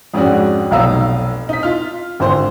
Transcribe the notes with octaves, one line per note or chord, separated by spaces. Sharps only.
F2 G#2 C#4 D4 F#4
F1 B1 D#4 F5 A#5 E6
D#4 B6
F4 F6
G#1 D3 C5 C6